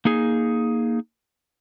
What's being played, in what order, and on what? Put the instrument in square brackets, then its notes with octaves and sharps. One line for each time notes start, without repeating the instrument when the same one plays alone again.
[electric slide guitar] A#3 D#4 G#4